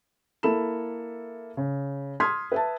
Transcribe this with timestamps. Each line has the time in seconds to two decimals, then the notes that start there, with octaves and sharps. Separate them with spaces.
0.43 A#3 E4 A4 B5 E7
1.57 C#3
2.20 C6 D#6 F6 G#6 B6
2.52 B4 E5 A5